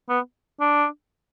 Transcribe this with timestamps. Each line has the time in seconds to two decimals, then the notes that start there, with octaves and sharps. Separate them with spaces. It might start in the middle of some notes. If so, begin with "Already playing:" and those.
0.09 B3
0.60 D4